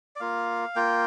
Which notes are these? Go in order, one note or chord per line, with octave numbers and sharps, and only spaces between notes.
D5
A#3 F4 F5
A#3 F4 G5